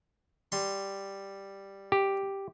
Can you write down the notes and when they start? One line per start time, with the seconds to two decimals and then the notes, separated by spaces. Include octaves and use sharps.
0.52 G3 C6
1.92 G4